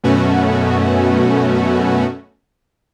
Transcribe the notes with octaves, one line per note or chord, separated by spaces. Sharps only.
F#2 B2 A3 B3 C#4 F#4